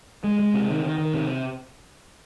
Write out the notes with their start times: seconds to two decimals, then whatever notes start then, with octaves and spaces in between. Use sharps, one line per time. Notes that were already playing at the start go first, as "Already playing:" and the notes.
0.24 G#3
0.39 G#3
0.54 C3
0.69 D#3
0.84 D#3
0.98 D#3
1.14 C3